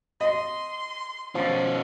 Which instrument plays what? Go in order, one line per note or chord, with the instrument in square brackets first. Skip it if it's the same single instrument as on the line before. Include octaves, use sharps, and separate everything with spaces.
[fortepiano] D#5 [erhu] C6
[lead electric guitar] B2 C#4 [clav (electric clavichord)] F3